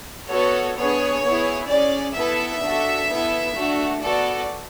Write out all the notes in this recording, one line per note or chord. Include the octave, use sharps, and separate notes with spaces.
B3 F#4 A4 C#5
B3 D4 G#4 C#5
B3 E4 G#4
C#4 G#4 D5
B3 E4 A4 E5
D4 F#4 A4
B3 E4 A4
A3 D4 F#4
B3 F#4 A4 D5